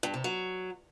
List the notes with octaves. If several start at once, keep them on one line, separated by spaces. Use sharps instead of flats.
G2
C3
F#3